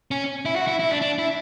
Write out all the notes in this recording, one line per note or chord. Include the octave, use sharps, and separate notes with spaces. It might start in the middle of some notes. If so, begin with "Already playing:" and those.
C#4
E4
F#4
E4
E4
D4
D4
E4